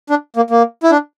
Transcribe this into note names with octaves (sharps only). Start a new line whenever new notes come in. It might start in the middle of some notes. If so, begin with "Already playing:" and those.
D4
A#3
A#3
E4
D4